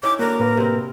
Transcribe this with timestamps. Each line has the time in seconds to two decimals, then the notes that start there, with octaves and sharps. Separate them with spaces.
0.03 C#4 D#4 E4 D6
0.19 D3 A#3 D4 F#4 A#4
0.40 A2 A#3 B4
0.57 C3 C4